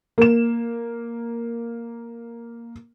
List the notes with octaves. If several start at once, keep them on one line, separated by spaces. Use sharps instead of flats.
A#3 E7